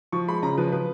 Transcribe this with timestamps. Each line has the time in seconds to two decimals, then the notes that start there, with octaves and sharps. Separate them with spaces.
0.12 F3 C#6
0.28 G#3 B5
0.42 C#3 A#5
0.58 F3 B4
0.72 F3 B4